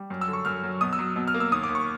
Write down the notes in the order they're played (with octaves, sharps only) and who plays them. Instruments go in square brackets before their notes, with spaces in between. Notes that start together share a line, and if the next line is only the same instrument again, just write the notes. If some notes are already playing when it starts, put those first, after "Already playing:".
Already playing: [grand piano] G3
F#2
E6
D3
C#6
F#2 F6
F#3
B2 D#6
E6
F#3
B2
F6
A#3
E6
D#2 D#6
D6
D#2
C#6